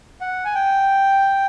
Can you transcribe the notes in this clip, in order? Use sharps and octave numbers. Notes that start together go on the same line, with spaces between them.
F#5
G#5
G5